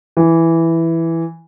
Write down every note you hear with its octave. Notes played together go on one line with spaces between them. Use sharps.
E3